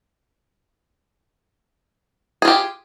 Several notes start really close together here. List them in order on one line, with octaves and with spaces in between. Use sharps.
G#4 F4 G4